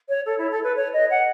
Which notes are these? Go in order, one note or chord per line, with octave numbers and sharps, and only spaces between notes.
C#5
A4
E4
A4
B4
C#5
D#5
F#5